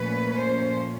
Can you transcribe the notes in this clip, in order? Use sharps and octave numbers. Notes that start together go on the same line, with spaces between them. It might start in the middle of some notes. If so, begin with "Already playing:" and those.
Already playing: A#2 F3 A3 C#4 B4
C5